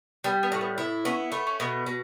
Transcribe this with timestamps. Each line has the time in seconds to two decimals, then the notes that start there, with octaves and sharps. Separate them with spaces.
0.24 G3 B3
0.43 B3
0.52 A2 A3
0.61 B3
0.78 B3 E4
1.05 B3 C#4
1.32 A3 B3
1.47 C#4
1.60 B2 B3
1.86 B2